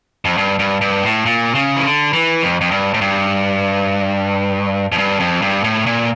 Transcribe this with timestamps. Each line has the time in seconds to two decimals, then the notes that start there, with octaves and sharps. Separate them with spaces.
0.25 F2
0.38 G2
0.59 G2
0.81 G2
1.03 A2
1.26 A#2
1.55 C#3
1.76 E3
1.84 D3
2.13 E3
2.43 F2
2.61 F2
2.71 G2
2.94 A2
3.01 G2
4.92 F2
4.98 G2
5.20 F2
5.42 G2
5.64 A2
5.86 A#2